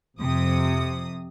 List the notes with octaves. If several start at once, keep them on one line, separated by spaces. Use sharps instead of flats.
F2 C3 D#6